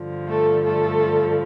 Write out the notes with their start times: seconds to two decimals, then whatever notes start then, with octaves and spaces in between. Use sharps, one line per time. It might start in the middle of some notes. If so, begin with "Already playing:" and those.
Already playing: G2 D3 F3
0.28 A3 A4
0.65 A3 A4